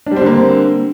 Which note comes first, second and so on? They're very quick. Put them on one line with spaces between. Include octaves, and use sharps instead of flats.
D4 G3 C4 D3 A#3